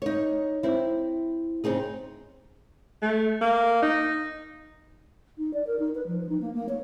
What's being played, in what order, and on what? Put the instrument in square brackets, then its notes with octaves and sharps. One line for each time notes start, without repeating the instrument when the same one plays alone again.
[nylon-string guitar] D#4 C#5
C4 E4
C#3 C4 D#4 G#4
[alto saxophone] A3
A#3
D#4
[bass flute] D#4
D5
A#4
D#4
B4
F3
D#4
A#3
A#3
C#5